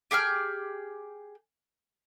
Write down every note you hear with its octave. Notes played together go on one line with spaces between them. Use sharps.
G4 G#4 G5 F6